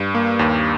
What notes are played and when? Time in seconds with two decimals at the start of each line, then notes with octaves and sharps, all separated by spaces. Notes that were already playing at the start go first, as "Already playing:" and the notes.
Already playing: G2
0.15 A#3
0.39 D#2